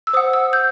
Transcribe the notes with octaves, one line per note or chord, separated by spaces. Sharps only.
E6
C5 F#5 D#6
E6
G6